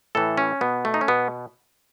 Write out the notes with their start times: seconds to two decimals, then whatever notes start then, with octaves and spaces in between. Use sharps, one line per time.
0.15 A2 E3 A4
0.37 C#4
0.61 B2 B3
0.85 A3
0.94 D#4
1.01 C#4
1.08 B2 B3